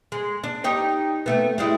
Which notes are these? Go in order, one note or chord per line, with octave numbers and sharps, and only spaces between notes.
G#3
D4
D#4 G4 C#5
C3 A3 B3
G3 G#3 E4